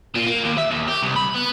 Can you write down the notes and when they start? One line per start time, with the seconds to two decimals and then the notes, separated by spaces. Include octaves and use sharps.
0.15 A#2
0.27 A#3
0.44 D#2
0.58 E5
0.71 D#2
0.88 G4
1.03 C2
1.16 B5
1.34 B3